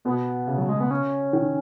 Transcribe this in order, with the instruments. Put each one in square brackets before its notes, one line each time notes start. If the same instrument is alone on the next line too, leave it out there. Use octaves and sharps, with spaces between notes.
[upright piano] B2 [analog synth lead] B3
[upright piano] C#3
[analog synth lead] F#3
G#3
B3
C#4
[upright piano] D#3